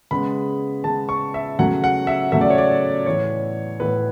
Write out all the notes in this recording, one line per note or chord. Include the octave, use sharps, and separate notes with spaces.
C#3 G#3 B3 B5
C#3 G#3 B3 A5
C#6
E5
E2 C#3 F#3 A3 F#5
F#5
E5
E2 C#3 F#3 A3 E5
D5
C#5
D5
A2 E3 B3 C#5
A2 E3 B3 B4